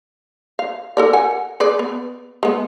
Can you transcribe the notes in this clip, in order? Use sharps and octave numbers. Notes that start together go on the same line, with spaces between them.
F5
A4 A#4 D5
F#5 G#5
G#4 B4 D5
B3
G#3 B3